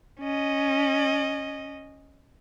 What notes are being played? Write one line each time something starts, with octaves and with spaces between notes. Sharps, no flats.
C#4 D#5